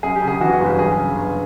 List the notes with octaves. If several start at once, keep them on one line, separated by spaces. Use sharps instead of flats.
F#2 G#4
G4
C#3
G#4
E3 F#4
F#4
G1
G4
F#2 G#4
C#3
G1